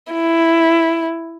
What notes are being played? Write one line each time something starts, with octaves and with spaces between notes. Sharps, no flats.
E4